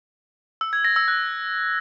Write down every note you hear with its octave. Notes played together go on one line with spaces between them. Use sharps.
E6
G#6
A#6
E6
F#6